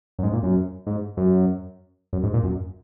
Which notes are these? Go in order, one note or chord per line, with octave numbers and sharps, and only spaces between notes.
F#2
G#2
A#2
F#2
G#2
F#2
F#2
G#2
A#2
F#2